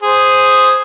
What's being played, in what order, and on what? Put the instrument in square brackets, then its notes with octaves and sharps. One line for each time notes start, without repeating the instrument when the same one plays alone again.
[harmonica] G#4 C5